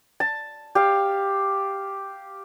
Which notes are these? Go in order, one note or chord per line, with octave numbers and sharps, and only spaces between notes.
A5
G4 F5